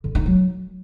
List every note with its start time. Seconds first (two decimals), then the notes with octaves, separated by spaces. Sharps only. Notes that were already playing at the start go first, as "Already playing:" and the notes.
0.04 D3
0.15 D#4
0.26 F#3